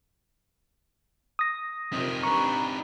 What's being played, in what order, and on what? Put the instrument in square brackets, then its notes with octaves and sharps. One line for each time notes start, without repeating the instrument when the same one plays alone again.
[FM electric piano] D#6 A#6
[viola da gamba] F2 C3 A#4 [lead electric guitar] C4 D#4
[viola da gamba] D4 G4 B4 [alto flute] A#5 [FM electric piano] C#6